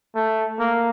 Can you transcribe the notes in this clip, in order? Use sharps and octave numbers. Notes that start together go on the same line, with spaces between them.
A3
A#3